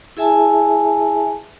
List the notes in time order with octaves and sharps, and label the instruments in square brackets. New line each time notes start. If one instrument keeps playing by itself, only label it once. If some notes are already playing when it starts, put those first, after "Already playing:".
[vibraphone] E4 G#4 E5 G#5 A5